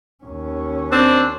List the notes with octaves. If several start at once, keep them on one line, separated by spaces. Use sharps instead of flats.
D#2 C#4
C4 D4